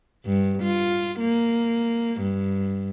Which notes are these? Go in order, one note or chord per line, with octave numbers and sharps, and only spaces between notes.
G2
F4
A#3
G2